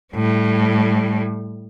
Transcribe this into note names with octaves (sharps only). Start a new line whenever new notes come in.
A2 G3